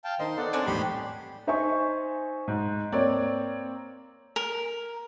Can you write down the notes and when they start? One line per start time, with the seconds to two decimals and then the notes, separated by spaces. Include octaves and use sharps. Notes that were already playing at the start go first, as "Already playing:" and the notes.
0.04 F5 G5 A5
0.20 D#3 D#4 C5 C6
0.38 B3 D#4 A4 D5 F#5
0.53 F#3 G#3 C4 D4
0.66 G#1 E2 A2 G3 G4 B5 C6
1.47 D#4 C5 E5 G#5 C#6
2.48 G#2
2.92 A#3 C4 C#5 D5
4.36 A#4